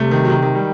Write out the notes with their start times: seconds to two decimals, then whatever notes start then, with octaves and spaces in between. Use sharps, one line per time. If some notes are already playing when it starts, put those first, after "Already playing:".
Already playing: C3 G3 A3
0.11 D#3
0.25 F#3
0.30 D#3
0.42 D#3
0.55 G3